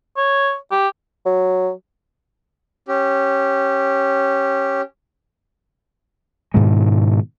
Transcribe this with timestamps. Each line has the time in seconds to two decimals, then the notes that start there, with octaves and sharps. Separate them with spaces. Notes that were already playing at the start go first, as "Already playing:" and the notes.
0.17 C#5
0.72 G4
1.26 F#3
2.88 C#4 G4
6.54 G#2 B2 D#3 G#3